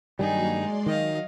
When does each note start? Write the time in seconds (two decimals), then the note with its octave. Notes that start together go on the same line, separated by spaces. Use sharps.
0.19 G2 D#3 F#3 G3 A#3 D#4 F#4 G#4
0.51 G#3 D5 C6
0.86 D#3 F#3 D#5 F5